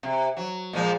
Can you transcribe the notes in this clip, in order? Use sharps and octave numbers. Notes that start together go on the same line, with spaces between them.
C3
F#3
A#2 F3 G#3